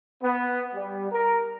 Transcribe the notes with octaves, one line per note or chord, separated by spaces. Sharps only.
B3
G3
A#4